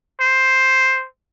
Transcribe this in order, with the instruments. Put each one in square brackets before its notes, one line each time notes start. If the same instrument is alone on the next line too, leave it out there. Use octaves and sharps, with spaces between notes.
[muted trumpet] C5